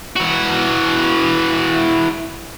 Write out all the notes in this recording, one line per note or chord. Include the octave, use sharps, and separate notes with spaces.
E3 F#4